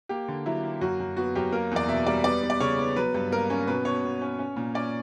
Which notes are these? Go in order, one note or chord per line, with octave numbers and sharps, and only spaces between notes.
A#3 G4
D3
F#3 E4
A#3
F#2 F#4
F#2
B3 F#4
F#2 G4
A#3 A#4
E2 D5
B2 E5
G3 D5
B3 D5
B3
D5
C#3 C#5
B3
F#3 B4
G2
A#3 A#4
C#4
B2 B4
B2 C#5
B2
C#4
C#4
A#2
C#4 D5